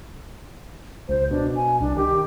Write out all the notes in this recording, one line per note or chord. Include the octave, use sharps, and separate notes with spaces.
C#2 C5
B2 D4
G#5
C2 D4
D#3 G4